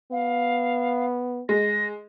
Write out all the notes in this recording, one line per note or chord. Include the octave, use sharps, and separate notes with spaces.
B3 F5
G#3 A#6